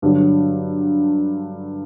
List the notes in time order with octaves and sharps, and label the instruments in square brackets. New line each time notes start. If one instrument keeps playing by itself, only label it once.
[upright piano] G2 D3 F#3